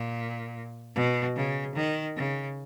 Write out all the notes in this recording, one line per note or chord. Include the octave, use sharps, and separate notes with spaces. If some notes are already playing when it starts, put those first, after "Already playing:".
Already playing: A#2
B2
C#3
D#3
C#3